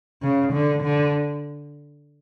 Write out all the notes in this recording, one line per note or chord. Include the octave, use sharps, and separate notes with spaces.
C#3
D3
D3